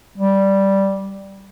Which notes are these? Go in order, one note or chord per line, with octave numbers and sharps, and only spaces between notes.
G3